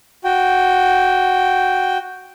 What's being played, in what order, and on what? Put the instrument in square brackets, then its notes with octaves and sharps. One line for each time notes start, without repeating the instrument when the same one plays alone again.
[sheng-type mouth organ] F#4 G5